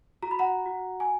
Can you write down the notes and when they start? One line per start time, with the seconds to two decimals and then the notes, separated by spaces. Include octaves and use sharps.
0.23 F#4 A#5
0.31 B5
0.39 F#5 A#5
0.66 F#4
1.00 G#5